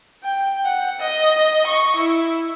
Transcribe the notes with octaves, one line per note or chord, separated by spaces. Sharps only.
G5
F#5
D#5
C#6
E4